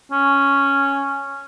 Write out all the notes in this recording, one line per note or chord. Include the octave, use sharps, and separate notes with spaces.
C#4